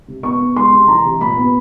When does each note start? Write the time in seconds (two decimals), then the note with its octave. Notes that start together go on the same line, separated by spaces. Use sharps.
0.08 C3
0.23 B3 C#6
0.40 B3
0.56 G#3 C6
0.72 C3
0.88 E3 A#5
1.05 C3
1.21 A#2 B5
1.37 B3